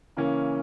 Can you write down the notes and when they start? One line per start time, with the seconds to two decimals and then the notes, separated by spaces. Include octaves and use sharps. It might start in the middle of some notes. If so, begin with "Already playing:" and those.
0.17 C#3 E3 A#3 C#4